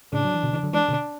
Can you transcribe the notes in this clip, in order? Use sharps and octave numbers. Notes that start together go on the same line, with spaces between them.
A2 C#3 D4
F#3
E3
B2 D3
C#3 E3
D3 F#3
E3 G#3 D4
B2 D3